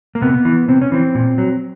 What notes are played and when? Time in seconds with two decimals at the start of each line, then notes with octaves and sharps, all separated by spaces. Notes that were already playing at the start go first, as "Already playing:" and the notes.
0.15 A#3
0.22 C3 B3
0.45 E3
0.68 C3 C4
0.82 C#4
0.92 E3 C4
1.15 A#2
1.38 F#3